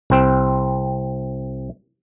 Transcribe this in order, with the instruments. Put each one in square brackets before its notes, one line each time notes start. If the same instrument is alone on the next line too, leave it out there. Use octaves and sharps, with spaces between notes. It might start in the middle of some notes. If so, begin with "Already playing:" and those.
[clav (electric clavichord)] C2 C4